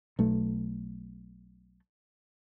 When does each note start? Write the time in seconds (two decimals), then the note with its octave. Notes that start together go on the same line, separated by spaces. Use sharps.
0.19 B1 A3